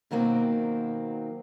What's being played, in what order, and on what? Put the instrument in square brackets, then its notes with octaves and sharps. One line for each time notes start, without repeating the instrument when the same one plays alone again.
[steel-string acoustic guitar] B2 D#3 F#3 A#3 C4